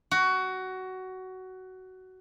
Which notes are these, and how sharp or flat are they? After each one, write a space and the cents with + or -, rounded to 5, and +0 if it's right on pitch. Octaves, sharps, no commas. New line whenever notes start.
F#4 +15